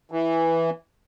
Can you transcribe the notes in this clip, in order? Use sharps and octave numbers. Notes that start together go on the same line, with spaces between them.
E3